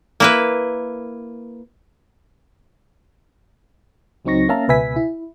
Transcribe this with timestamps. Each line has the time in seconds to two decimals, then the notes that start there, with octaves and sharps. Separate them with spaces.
0.20 A#3 E4 B4
4.25 C#2 F#3 C4 D#4 C#6 A#6
4.49 A#3 C#4 E5 F5 A5 A#5
4.68 C#2 B2 B4 E5 G#5 B6
4.96 E4